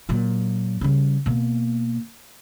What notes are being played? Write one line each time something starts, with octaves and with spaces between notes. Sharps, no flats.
A#2 F#3
C#3 G3
B2 A#3